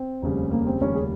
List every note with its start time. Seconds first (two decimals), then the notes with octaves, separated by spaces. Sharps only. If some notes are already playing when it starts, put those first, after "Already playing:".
Already playing: C4
0.22 F1 D#2 C#3 G3
0.51 A#3
0.67 C4
0.80 F1 D#2 C#3 G3 C#4
0.95 G#4